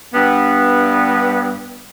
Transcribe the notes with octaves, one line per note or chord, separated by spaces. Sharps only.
G2 B3